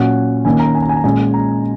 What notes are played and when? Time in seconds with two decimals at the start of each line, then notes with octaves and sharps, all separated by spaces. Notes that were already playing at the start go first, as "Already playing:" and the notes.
Already playing: A#2 F#3 C#4 F#5
0.45 D#3 A#3 C#4 G#5
0.60 A#5
0.75 G#5
0.82 A#5
0.89 G#5
0.96 A#5
1.04 A#2 G#3 C#4 G#5
1.34 A#5